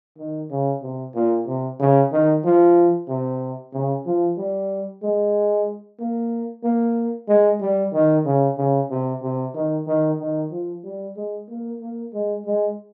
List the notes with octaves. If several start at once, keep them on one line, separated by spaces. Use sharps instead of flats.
D#3
C#3
C3
A#2
C3
C#3
D#3
F3
C3
C#3
F3
G3
G#3
A#3
A#3
G#3
G3
D#3
C#3
C#3
C3
C3
D#3
D#3
D#3
F3
G3
G#3
A#3
A#3
G#3
G#3